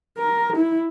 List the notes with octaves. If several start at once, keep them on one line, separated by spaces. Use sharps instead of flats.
A#4
E4